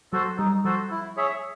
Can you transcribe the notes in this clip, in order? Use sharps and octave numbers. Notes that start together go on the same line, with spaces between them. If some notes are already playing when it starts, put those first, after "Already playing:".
F#3 F#4 A4 C5
G3 D#4
F3 F#4 A4 C5
E4
G#4 C#5 E5